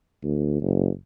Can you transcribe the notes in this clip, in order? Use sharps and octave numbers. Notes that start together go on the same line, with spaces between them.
D2
F#1